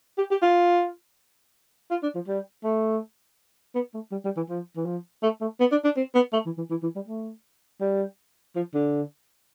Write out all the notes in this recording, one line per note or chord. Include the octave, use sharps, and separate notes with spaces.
G4
G4
F4
F4
D4
F3
G3
A3
B3
A3
G3
G3
E3
F3
E3
F3
A3
A3
B3
D4
D4
C4
B3
A3
E3
E3
E3
E3
G3
A3
G3
F3
D3